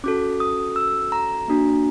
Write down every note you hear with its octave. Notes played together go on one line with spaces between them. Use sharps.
C#4 F#4 A4 D6
D#6
E6
A#5
A#3 D4 F#4